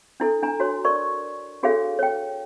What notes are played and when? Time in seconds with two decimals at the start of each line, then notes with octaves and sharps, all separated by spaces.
0.20 D4 E4 A4
0.43 D4 G#5 A#5
0.60 F#4 C#5 C6
0.85 A#4 D5 C#6
1.63 D4 F#4 G#4 A4 C#5 F5
1.99 C#5 G5